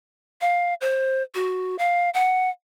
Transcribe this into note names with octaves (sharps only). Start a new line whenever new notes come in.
F5
C5
F#4
F5
F#5